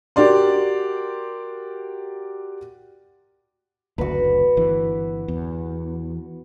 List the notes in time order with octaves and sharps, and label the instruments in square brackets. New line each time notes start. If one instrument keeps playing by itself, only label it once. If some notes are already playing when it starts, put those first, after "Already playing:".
[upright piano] F#4 G4 A#4 D5 C6
[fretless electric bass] F#1 D2 [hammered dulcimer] F#4 B4
[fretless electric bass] G1 E3
E2